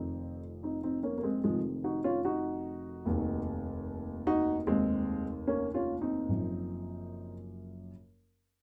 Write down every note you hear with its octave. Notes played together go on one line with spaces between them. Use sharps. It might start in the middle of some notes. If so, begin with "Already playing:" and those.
Already playing: F1 F2 D#3 C4 D#4
C4 D#4
C4 D#4
A#3 C#4
A#3
G#3 C4
F1 F2 C3 D#3 F3 G#3
D#4 F#4
C#4 F4
D#4 F#4
F1 D#2 D#3
D#4 F#4
F1 D#2 D#3 G#3 C4
A#3 C#4
C#4 F4
C4 D#4
F#1 F#2 F3